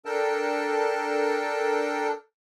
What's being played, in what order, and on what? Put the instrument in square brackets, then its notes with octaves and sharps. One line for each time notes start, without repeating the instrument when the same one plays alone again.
[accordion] D4 A4 A#4 G5 A5